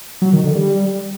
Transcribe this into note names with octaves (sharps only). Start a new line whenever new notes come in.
F#3
D#3
D3
G3